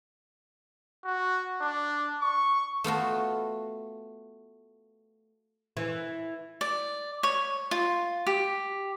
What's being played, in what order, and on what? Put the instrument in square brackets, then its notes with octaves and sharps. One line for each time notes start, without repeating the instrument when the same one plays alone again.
[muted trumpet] F#4
D4
C#6
[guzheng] A3 B3 F4 F#4
[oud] E3
[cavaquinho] D5
C#5
F4
G4